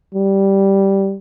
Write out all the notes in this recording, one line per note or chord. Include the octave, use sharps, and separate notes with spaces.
G3